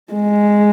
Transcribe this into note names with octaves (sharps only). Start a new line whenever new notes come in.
G#3